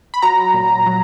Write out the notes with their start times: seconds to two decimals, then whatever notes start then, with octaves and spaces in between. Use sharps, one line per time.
0.14 B5
0.22 F#3 A#5
0.54 A#2
0.86 F#3